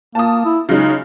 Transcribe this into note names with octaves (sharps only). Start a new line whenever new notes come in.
A#3 A5 D#6
E4
C#3 F#3 G#3 D#4